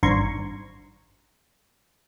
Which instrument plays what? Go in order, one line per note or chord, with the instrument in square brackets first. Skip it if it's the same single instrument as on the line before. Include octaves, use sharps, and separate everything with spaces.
[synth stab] G#1 G2 A#5 C6 C#6 G#6